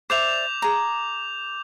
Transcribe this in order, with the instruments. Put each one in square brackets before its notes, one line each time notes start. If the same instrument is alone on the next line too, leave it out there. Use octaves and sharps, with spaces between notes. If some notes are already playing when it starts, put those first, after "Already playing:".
[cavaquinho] C5 D5 E5 [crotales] D6 G6 F7
[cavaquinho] G#4 A#5